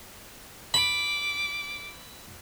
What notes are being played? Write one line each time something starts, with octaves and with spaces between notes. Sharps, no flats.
B5 D6